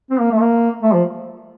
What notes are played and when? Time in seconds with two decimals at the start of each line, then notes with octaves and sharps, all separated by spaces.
0.10 C4
0.20 A#3
0.31 A3
0.40 A#3
0.83 A3
0.94 F3